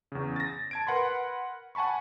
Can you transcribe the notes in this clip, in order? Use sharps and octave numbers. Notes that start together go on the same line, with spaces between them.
E2 C#3
A6 A#6
A5 G#6 D7
A#4 B4 F#5 B5 C6
F#5 G#5 A5 B5 C#6